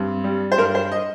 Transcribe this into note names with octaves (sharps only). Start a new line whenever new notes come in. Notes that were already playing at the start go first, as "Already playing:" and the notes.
Already playing: G2 C4
G3
C5
G2 A#4
C5
D#5